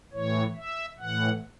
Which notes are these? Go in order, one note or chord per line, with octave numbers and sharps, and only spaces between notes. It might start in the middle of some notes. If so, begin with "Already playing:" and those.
A2 E3 C#5
E5
A2 E3 F#5